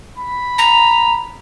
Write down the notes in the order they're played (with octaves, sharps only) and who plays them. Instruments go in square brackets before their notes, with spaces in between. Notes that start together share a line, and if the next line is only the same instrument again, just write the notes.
[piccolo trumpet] B5
[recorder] A#5